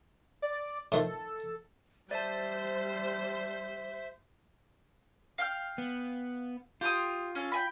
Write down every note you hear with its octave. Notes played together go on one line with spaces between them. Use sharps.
D5
A2 D#3 F3 A4
G3 C5 D5 E5 A5
F5 G5 F6
B3
F4 G4 C6 D#6
C#4 A4
G5 G#5 B5